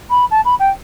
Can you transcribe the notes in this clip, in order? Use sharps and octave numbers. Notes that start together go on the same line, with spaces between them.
B5
A5
B5
G5